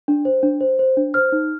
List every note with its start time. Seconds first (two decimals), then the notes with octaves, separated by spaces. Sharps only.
0.08 D4
0.25 C5
0.43 D4
0.61 C5
0.79 C5
0.97 D4
1.14 C5 F6
1.32 D#4